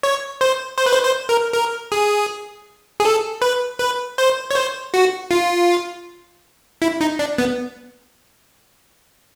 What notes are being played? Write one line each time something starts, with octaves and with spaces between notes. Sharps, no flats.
C#5
C5
C5
B4
C5
C5
A#4
A#4
G#4
G#4
A4
B4
B4
C5
C#5
C5
F#4
F4
E4
D#4
D4
B3